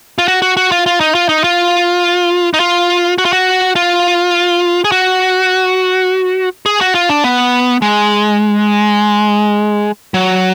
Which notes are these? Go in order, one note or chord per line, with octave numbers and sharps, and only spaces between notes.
F4
F#4
F#4
F#4
F4
F4
D#4
F4
D#4
F4
D#4
F4
F#4
F4
F#4
F4
G#4
F#4
G#4
F#4
F4
D4
B3
G#3
F#3